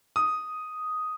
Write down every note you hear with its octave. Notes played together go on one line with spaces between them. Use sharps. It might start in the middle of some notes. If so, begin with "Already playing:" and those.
D#6